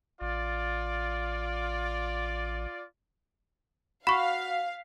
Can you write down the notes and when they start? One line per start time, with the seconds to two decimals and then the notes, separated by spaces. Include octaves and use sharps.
0.21 A1 F4 D5
4.07 F#4 F5 B5 C#6 B6